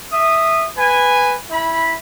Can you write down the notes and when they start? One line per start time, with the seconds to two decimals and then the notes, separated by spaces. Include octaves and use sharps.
0.12 E5 D#6
0.77 B4 G#5
1.50 E4 B5